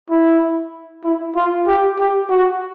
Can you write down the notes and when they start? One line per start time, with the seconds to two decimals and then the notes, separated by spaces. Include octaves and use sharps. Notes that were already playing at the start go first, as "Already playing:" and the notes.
0.10 E4
1.04 E4
1.36 F4
1.67 G4
1.98 G4
2.30 F#4